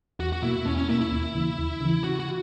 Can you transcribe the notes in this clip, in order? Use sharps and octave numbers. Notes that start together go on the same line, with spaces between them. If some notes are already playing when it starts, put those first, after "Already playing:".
E2 F#4
F#4
B2 A#3 E4
E2 C#4
C#4
B2 A#3 E4
E4
D#2
C#3 E3
D#2
C#3 E3
C#3 F#4
F#4